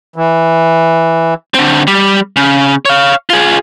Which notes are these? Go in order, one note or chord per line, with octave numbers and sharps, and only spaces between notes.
E3
D3 C4
G3
C#3
C#5 F5
F4 G#4